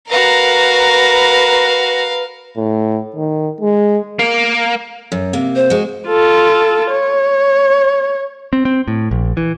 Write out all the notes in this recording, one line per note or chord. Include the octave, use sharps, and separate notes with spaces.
F#4 A#4 B4 F5 A#5
A2
D#3
G#3
A#3
F#2
C3 A#3
C5
G#3 F#4
F4 A4
C#5
C4
C4
A2
A#1
E3